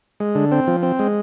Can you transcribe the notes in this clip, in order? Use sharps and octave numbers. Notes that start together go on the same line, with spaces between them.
G#3
D3
C4
F3
C4
G#3